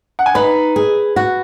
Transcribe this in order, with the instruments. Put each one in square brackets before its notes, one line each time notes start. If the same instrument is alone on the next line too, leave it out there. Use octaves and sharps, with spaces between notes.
[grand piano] F#5
G#5
[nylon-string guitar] D#4 [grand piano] B4 B5
[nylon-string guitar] G#4
F#4